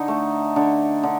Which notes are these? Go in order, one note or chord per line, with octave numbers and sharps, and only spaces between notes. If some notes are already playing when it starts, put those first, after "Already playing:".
Already playing: D3 D#4
A3
D3
D3